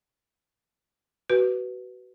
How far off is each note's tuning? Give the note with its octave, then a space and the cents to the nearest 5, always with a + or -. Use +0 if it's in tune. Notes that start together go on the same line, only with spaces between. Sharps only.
F#4 +30 B4 +0